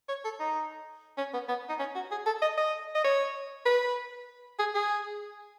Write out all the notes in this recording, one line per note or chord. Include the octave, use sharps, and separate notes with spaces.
C#5
A4
D#4
C#4
B3
B3
D#4
C#4
F#4
G#4
A4
D#5
D#5
D#5
C#5
B4
G#4
G#4